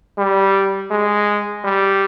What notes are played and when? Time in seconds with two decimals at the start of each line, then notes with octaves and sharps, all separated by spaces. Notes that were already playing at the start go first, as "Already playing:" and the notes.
0.18 G3
0.91 G#3
1.64 G3